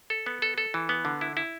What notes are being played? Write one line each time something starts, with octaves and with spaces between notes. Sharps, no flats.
A4
B3
A4
A4
E3
B3
D3
E4
E4